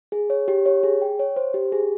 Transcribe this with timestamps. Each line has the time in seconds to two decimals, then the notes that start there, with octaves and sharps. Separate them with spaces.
0.12 G#4
0.30 C#5
0.48 G4
0.66 C#5
0.83 G#4
1.02 G5
1.19 C#5
1.36 C5
1.54 G4
1.72 G#4